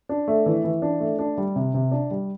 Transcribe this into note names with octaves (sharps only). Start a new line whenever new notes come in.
D4
A3
E3
E3
D4
A3
D4
G3
C3
C3
D4
G3